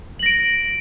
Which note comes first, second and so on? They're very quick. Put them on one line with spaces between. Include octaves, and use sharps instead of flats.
F#7 A#6 D7